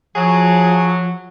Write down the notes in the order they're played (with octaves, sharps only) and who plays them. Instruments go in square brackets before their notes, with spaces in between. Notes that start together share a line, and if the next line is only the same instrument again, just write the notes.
[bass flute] F3 [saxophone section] F#3 [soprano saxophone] G#4